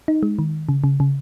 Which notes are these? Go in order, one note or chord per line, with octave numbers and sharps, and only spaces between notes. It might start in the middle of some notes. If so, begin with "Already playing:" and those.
D#4
G#3
D#3
C#3
C#3
C#3